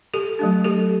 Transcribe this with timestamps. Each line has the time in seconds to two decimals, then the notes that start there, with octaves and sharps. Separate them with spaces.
0.14 G4 A4
0.39 F#3 A3 D4
0.64 G4 A4